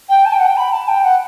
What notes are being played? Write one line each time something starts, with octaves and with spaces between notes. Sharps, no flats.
G5
A5
G5
F#5
G5
B5
A5
G5
F#5